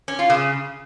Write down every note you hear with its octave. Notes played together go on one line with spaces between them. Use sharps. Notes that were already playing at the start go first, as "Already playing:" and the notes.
C#4
F4
C#3